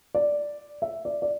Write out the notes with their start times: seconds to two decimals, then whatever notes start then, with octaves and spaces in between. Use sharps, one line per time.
0.15 D5
0.82 E5
1.05 D5
1.22 D5